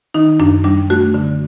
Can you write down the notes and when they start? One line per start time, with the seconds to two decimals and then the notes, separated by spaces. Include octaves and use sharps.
0.14 D#3 D#4
0.40 F#2 D4
0.64 G3 D4
0.90 A3 F#4
1.14 D3